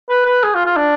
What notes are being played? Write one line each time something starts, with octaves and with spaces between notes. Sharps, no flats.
B4
B4
G#4
F4
F4
D4